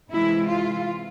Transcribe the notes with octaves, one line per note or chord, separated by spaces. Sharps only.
C3 E3 G#3 E4
F4